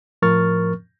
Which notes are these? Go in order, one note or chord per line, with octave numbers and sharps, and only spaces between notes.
A2 F3 A#4 C#6 F6 A6